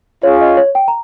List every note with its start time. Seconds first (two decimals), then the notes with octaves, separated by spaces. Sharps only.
0.23 C#4 F4 G#4 C#5
0.41 D#5
0.57 C#5
0.75 G5
0.88 A#5